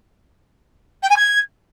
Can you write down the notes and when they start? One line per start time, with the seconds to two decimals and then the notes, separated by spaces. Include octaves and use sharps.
1.03 G5
1.09 G#5
1.16 G#6